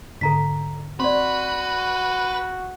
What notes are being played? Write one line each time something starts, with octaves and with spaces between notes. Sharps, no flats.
G#2 D3 A4 A#5 B6
C4 F#4 B4 D5 C6